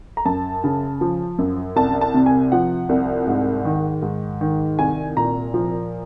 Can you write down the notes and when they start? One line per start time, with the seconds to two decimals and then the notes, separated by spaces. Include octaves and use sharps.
0.17 A#5
0.25 F#2 A5
0.64 C#3
1.01 F3
1.38 F#2
1.76 C2 A5
2.01 A5
2.14 C3
2.26 G#5
2.52 F3 F#5
2.89 C2
3.27 G#2
3.65 D#3
4.02 G#2
4.41 D#3
4.79 C2 G#5
5.17 A#2 A#5
5.54 F3